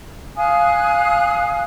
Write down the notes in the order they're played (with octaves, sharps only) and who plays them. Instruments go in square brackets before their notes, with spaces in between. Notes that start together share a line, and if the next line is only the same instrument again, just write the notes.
[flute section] F5 G#5 D#6 F#6